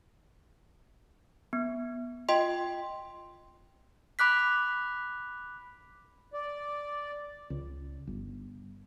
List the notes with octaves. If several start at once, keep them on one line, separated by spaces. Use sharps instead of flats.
B3
F4 D#5 G5 C6
B5 D6 F#6 B6
D5
C#2
G1